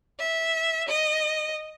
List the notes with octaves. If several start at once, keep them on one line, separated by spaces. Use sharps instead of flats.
E5
D#5